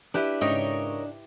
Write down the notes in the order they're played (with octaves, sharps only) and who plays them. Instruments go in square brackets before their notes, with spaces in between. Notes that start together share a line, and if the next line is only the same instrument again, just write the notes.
[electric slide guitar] D4 [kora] E4 G4 B4
[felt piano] G#2 C#3 [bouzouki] D#4 A#4 C#5 [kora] G4